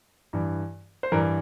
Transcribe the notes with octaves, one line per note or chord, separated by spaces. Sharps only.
G2 E3
C5
G2 E3 A#4